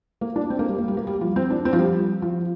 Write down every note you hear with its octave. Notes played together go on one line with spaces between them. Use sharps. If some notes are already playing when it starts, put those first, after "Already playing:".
A#3
D4
C4
A#3
G3
A#3
G3
A#3
G3
F3
C4
D4
C4
F3
G3
F3